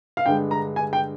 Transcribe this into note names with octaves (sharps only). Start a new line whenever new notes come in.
F5
G2 D3 G#3 G5
A#5
G#5
G5